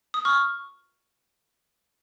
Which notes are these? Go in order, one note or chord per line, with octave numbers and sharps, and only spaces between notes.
D#6
C#6 F6